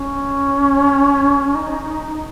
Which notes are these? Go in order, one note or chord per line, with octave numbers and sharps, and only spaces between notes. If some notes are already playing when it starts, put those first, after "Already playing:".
Already playing: C#4
D#4